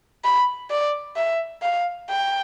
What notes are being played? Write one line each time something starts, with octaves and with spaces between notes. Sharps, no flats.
B5
D5
E5
F5
G5